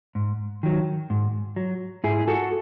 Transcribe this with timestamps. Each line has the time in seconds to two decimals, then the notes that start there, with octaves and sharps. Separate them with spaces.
0.15 G#2
0.63 D#3 F#3
1.10 G#2
1.56 F#3
2.04 G#2 E4 G#4
2.28 F#4 A4